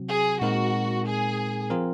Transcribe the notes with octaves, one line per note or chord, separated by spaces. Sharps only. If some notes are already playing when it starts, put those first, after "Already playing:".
Already playing: C3 F#3 C4 F#4
G#4
A#2 G#3 C4 D#4 F#4 A#4
G#4
F3 C4 F4 A#4